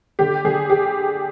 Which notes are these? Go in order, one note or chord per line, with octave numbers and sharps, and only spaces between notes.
D3 G4
D3 G#4
G4